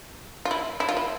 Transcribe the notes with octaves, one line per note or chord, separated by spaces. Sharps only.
F4
E4
E4
F4
E4